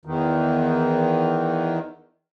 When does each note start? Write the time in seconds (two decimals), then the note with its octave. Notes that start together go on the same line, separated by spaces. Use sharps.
0.05 E2 D#3